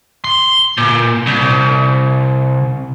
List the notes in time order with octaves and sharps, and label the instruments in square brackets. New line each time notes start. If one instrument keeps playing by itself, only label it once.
[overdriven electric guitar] C6
A#2
C2